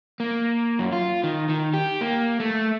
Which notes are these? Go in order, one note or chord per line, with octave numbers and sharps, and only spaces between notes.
A#3
F#2
F4
D#3
D#3
G4
A#3
A3